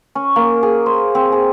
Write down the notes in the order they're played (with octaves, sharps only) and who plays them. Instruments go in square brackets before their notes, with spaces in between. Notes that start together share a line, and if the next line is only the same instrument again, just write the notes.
[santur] C#4
A#3
G#4
C5
C4
G#4